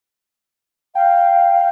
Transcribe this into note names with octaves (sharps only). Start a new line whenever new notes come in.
F5 G5